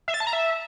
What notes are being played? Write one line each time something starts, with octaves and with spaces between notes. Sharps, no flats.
E5
A6
A5
A#5
E5